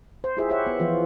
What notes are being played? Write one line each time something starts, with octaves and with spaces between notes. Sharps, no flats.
C5
E4 F4 G4 G#4 C5 E5
G4 G#4 C5 C#5 E5 F#5
B3
E3 F3 B3 F4